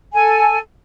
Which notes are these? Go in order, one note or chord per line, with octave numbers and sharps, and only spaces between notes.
A4 G#5